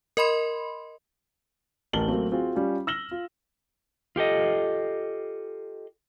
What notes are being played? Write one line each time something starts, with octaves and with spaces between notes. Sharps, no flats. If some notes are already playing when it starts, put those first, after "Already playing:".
A#4 D#5 B5 C6
A1 A2 A#4 A5 F#7 G7
F#3 A3 A#3 C4
C4 F4 F#4 G#4
G3 C#4 F4
E6 F6 A#6 E7 F#7 G7
F4
F4 G4 A4 D#5